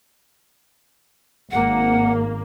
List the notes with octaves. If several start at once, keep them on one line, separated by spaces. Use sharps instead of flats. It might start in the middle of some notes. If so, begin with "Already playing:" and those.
G#1 A#3 F#5